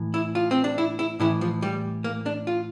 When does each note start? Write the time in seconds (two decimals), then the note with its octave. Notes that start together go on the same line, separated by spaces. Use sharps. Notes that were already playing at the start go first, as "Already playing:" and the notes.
Already playing: A2 E3
0.14 E4
0.35 F4
0.51 C4
0.64 D4
0.78 E4
0.99 E4
1.20 A2 E3 E4
1.41 F3
1.62 G3
2.04 A#3
2.26 D4
2.47 F4